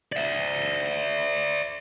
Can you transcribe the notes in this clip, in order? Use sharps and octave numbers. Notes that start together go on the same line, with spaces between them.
D5 E5